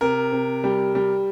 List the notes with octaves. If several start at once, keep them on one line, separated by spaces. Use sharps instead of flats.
C3 A#4
C3
G3
G3